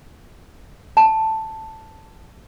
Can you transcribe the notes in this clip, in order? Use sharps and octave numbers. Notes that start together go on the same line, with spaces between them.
A5